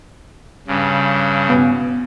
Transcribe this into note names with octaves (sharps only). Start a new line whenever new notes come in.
G2 C#3
B3